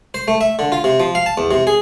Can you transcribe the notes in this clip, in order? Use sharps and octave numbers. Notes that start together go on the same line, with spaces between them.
C5
A3
E5
D3
F4
C3
F3
F5
A5
E2
C3
G#4